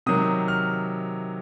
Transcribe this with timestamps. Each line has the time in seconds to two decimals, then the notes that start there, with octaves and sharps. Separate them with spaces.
0.06 C3 D#3 F#3 D#6
0.48 F6